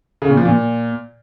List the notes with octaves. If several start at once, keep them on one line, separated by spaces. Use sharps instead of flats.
C#3
A#2
F3
A#2